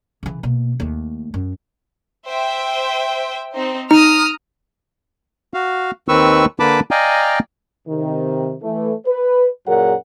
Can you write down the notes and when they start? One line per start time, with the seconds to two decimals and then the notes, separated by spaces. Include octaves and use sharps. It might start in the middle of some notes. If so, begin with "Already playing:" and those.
0.23 C#3 E3
0.43 B2 A#3
0.80 D#2 A3
1.34 F#2
2.29 C5 E5 G5
3.53 C4 D#4 C5
3.91 D#4 A#5 D#6 F6
5.54 F#4 F5
6.08 D#2 D#3 C4 B4 C#6 E6
6.60 D3 A#3 B4 A5 B5 D6
6.91 D5 D#5 F5 G5 G#5 A#5
7.87 C3 D#3
8.62 E3 A3
9.07 B4
9.67 F#2 A#2 F#3 G#4 A#4 F#5